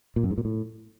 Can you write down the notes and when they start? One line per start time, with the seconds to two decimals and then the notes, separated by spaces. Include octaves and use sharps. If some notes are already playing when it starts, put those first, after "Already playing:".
0.16 A#2
0.23 F#2
0.31 G#2
0.38 A#2
0.45 A2